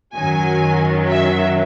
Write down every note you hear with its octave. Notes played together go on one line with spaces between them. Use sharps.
F#2 D#3 F#3 G#5
E5